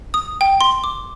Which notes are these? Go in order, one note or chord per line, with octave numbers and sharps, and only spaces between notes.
D#6
G5
C6
D6